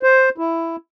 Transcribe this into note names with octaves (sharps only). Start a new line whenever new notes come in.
C5
E4